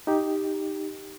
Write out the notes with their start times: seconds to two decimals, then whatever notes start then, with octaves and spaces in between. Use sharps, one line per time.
0.07 D#4 G4